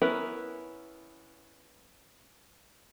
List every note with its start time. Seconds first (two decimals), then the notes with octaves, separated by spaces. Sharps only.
0.02 B3 C#4 E4 A#4 B4